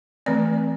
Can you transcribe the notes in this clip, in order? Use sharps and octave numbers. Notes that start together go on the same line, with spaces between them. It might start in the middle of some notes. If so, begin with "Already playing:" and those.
E3 A3 C4 D5